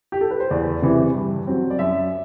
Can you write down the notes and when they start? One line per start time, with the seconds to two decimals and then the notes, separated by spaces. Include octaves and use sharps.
0.12 G4
0.21 A4
0.31 B4
0.40 C5
0.50 E2 D5
0.82 C3 E3
1.15 G2
1.47 F#3 C4
1.70 D5
1.79 F#2 E5